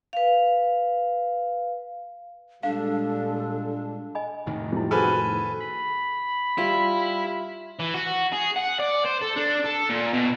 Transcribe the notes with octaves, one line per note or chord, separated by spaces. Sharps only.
B4 F5
A#2 G3 G#3 D4 A4 F5
D#5 G#5 B5
F1 A2 D#3
E3 F3 G3 E4 A#4
F#4 G#4 A4 B4 C5 G#5 F6
B5
G3 E4 F4
E3
F#4
G#4
F#5
D5
C5
A4
D4
A4
A#2
B2